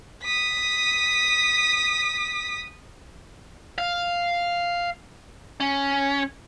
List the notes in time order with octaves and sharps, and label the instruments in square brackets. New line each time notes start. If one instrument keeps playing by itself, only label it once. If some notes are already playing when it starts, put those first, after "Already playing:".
[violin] D#6 B6
[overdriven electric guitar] F5
C#4